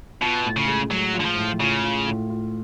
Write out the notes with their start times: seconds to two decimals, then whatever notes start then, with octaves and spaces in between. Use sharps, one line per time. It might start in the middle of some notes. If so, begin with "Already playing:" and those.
0.21 B2 F4
0.45 A2
0.57 C#3
0.67 G#3
0.91 F#3 G#3
1.14 F4
1.20 D3
1.26 F3
1.37 A2
1.59 C#3 F4
1.83 F4
2.06 A2
2.30 F4